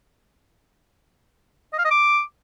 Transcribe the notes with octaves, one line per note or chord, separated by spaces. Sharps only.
D#5
F5
D#5
D6